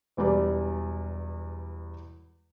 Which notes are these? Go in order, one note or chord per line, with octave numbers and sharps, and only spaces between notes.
E1 E2 G3 D5